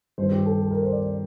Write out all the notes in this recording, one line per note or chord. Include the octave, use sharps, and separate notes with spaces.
G2 D#3 G3 C5
G4
A4
A4
A#4
C5
D5
D5